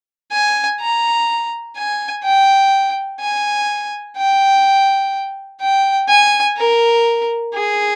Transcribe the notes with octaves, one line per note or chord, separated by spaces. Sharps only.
G#5
A#5
G#5
G5
G#5
G5
G5
G#5
A#4
G#4